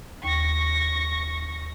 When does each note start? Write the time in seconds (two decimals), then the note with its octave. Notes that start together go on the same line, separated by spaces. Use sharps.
0.24 D#2 C#6 A#6